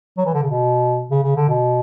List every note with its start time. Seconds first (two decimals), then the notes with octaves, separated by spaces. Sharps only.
0.18 F#3
0.26 E3
0.34 D3
0.42 C#3
0.50 B2
1.11 C#3
1.23 C#3
1.36 D3
1.48 B2